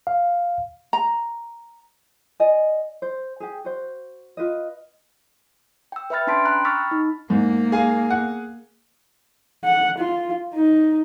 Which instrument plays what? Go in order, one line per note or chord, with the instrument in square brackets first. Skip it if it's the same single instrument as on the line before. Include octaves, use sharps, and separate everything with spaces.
[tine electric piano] F5
[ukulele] A#5
D5 D#5 G#5
C5
G4 G#4
F#4 C5
F4 B4 D#5
[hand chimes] G5 E6
B4 E5 G5 B5 F6 A6
C#4 D4 A5 C6 B6 D7
G5 A#5 B5 F#6
B5 C#6 E6 F6 A6 B6
D#4
[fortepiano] G#2 [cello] A#3
[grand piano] G#4 F5 G#5
[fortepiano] F#5
[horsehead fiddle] F#5
F4
D#4